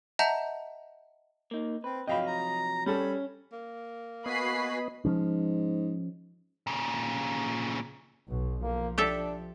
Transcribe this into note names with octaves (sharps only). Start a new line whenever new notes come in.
D#5 E5 F#5 A5 A#5 G6
A#3 D#4
C4 B4
C3 F3 F#3 D#5 F5 G5 B5
A#5
G3 C#4 A4 A5 B5
A#3
B3 F#4 B4 D#5 G#5 B5 C7
G#2 F3 C#4
A#2 C#3
B1 B2
F3 A#3
D4 G4 A4 E5